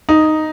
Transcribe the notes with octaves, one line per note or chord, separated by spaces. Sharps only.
D#4